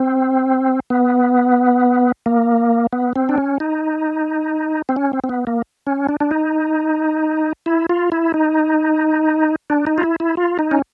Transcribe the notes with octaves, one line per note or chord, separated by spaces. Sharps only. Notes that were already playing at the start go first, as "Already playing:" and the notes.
Already playing: C4
B3
A#3
B3
C4
D4
C#4
D#4
C4
C#4
C4
C4
B3
A#3
C#4
D4
D4
D#4
E4
F4
E4
D#4
D4
D#4
F4
E4
E4
F4
D#4
C#4